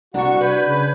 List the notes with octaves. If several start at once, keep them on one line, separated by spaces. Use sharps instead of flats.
C2 D4 F#4 F#5 A#5 C#6
B4 B5 G6 G#6
C#3